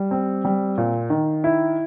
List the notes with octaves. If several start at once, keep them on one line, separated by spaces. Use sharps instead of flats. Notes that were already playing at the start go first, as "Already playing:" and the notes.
Already playing: G3
C4
G3
A#2
D#3
E4